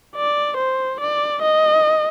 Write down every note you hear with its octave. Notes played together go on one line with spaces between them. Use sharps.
D5
C5
D5
D#5